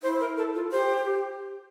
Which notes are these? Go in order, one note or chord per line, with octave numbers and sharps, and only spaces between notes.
E4 C5
A#4
A4
F4
G4 C5